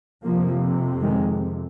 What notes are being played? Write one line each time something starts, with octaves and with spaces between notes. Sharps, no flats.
F2 C3 F3 A#3
D#3 G#3